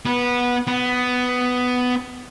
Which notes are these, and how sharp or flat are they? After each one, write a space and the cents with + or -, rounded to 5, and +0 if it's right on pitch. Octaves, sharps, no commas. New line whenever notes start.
B3 -15
B3 +10